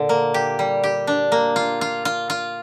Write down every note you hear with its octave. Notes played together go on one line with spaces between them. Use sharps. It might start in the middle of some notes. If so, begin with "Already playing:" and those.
Already playing: A#2 D3
A#3
G4
G3
G4
D4
A#3
F4
F4
F4
F4